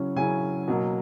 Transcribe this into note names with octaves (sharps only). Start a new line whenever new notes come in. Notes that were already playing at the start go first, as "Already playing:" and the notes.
Already playing: C#3 F#3 C#4 E4
C#3 F#3 C#4 E4 G#5
B2 F#3 A#3